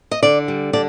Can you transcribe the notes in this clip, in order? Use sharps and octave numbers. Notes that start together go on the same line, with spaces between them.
D#5
D3 D5
G3
D3 D5